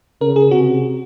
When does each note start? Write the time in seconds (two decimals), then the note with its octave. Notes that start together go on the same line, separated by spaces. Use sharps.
0.21 C#3 A#4
0.36 G#4
0.51 C3 F#4